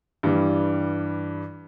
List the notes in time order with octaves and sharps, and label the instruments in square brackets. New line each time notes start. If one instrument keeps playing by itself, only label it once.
[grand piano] G2 E3 G3